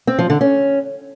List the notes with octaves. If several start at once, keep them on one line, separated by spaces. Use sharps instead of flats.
C4
F3
D3
C#4